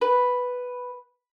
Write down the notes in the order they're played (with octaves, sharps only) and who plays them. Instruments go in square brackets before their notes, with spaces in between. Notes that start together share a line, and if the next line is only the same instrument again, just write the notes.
[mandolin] B4